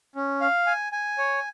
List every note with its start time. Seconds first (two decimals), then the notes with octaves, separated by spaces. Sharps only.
0.15 C#4
0.41 F5
0.67 G#5
0.92 G#5
1.18 C#5